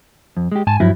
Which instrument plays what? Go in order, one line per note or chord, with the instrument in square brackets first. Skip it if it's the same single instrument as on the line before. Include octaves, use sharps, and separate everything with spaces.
[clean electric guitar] F2
G#3 G4
[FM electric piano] G#2 [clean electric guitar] G#5 A5
[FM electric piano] G2 F3 F#3 [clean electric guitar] E4